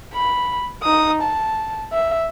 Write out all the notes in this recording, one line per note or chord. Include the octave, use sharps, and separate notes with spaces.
B5
D#4 D#6
A5
E5